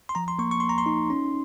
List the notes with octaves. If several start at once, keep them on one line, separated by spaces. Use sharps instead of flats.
C6
F3 A#5
C6
A#3 C#6
C#6
A#3 C6
A#5
C6
D#4
C#4